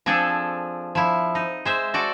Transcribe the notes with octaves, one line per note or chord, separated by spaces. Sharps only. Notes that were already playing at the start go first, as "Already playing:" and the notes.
F3 C4 D4 G#4 A4
F3 E4
D#4
G#3 C5 E5
F#4 A4 D5